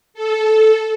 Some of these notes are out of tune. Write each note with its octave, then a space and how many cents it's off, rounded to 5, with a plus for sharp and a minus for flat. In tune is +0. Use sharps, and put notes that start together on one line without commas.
A4 -10